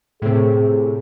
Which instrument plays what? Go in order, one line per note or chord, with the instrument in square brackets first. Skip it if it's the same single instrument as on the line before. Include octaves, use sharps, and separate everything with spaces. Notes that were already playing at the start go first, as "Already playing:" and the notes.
[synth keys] A2 C3 [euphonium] G#4